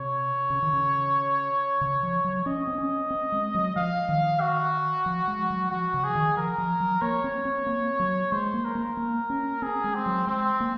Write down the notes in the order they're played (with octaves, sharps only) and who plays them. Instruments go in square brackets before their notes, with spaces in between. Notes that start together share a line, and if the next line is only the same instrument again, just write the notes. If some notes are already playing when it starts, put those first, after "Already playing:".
Already playing: [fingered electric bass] C3 [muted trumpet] C#5
[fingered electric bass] C#3
D#3
C#3
C#3
F3
F#3
[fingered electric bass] C#4 [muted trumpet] D#5
[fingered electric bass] C4
C#4
C4
G#3
F#3
[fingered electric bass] F3 [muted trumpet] F5
[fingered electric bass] D#3
[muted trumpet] F#4
[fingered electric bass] F3
G#3
F#3
[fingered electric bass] F3 [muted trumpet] F#4
[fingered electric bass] C#3
[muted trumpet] G#4
[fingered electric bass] D#3
[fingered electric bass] F3 [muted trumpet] A#4
[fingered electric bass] F3
F#3
[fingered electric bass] A#3 [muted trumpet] C#5
[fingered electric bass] C4
C4
A#3
F#3
[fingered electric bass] G#3 [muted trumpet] C5
[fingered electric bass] A#3
[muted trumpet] A#4
[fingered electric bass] A#3
A#3
C#4
[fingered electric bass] C4 [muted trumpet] G#4
[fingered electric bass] G#3
[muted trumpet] C4
[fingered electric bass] F#3
[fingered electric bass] G#3 [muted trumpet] C4
[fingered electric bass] A#3